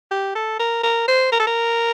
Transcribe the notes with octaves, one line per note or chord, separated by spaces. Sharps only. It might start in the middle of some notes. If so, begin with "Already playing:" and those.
G4
A4
A#4
A#4
C5
A#4
A4
A#4